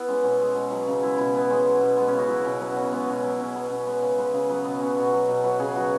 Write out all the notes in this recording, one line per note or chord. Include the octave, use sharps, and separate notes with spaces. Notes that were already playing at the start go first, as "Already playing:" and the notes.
Already playing: B3 E4 B4
G#3 C#4
B2 C#4
G#3
B2
F#3
C#3
G#3 E4
B2 E4
E3 B3
G#3 C#4
F#3
B2
G#3 B3
C#4
C#3
F#4
F#3 E4
B2 C#4
F#3 B3
C#3 C#4
G#3 B3
B2 C#4
F#3 E4
B2 C#4
F#3 B3
B2 C#4
G#3 B3
C#3 C#4
G#3 B4
C#3 G#4
F#3 B3
B2 B3
F#3 C#4
B2 F#4
F#3
B2
F#3 B4
C#3 G#4
F#3 F#4